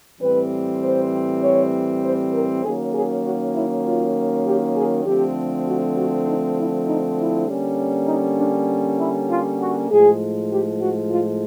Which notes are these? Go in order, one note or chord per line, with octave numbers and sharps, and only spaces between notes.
A2 E3 G3 C4 B4
C5
C#5
C5
A#4
D#3 F#3 A#3 C#4 G#4
G#4
F#4
E4
F4
G4
G#4
D3 F3 A3 C4 G4
F#4
F#4
D#4
E4
D#4
E4
D3 G3 A#3 C#4
D#4
D4
E4
F4
F#4
A2 F3 G#3 G#4
G4
F#4
F4